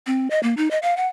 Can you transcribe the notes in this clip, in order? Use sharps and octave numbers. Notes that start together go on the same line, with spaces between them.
C4
D#5
A#3
D#4
D#5
F5
F#5